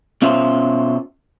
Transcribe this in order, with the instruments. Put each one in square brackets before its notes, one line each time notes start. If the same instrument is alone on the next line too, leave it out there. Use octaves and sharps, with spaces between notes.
[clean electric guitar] B2 C#4 F4 C5 E5